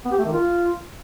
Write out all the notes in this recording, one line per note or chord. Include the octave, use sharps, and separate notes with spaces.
B3
G4
A3
D#3
F4